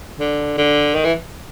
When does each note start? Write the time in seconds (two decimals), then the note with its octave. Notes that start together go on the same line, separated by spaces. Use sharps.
0.20 D3
0.58 D3
0.94 D#3
1.04 E3